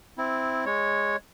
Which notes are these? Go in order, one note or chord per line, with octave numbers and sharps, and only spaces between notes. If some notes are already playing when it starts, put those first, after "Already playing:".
C4 E4
G#3 C#5